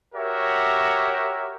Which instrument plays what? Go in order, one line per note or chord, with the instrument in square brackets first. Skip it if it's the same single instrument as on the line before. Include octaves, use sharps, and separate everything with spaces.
[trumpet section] F#4 G4 A#4 C#5 E5